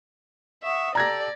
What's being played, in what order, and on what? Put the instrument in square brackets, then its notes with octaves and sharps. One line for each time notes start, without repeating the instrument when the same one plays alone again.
[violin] E5 [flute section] F#5 C#6 D#6
[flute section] G4 A4 [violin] D5 [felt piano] A#5 G#6 A#6